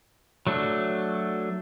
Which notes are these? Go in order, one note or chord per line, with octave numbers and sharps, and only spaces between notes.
F#3 A3 D4